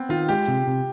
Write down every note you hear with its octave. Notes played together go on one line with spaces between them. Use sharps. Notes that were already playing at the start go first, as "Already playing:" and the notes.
Already playing: B3 C4
D#3 F4
G#3 G4
C3
C3